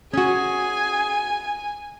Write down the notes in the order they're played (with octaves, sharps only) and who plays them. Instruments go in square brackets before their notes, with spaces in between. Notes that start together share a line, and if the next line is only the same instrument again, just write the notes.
[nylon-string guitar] C#4 F#4 [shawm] G#4 [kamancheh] G#5